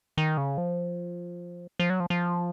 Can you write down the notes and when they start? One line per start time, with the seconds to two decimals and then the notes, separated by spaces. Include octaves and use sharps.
0.18 D#3
0.37 C#3
0.58 F3
1.79 F3
1.90 F#3
2.00 F3
2.10 F3